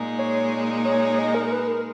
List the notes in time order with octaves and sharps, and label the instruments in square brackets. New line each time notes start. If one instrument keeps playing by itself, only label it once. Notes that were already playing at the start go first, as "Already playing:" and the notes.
Already playing: [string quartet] A#2 G#3 D#4
[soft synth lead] C#5
C#5
D#5
A#4
A#4
B4
A#4